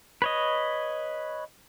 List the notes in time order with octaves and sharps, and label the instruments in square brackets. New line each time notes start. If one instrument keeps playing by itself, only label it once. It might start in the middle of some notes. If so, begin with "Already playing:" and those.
[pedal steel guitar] B4 C#5 D#5